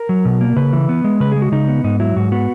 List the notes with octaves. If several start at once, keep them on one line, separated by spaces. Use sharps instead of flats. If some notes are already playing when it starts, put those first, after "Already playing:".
Already playing: A#4
F#3
B2
A#3
C#3 B4
E3
B3
G#3
C#3 B4
G#4
G#3
F#4
C#3 D#4
B3
G#2 D#4
F#3 E4
G#2 F#4
B3 F#4